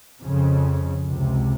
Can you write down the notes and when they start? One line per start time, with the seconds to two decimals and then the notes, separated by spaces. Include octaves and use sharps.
0.22 F2 C#3
1.05 C#2 C3